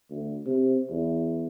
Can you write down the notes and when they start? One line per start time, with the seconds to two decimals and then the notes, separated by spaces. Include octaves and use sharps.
0.10 D2
0.46 C3
0.90 E2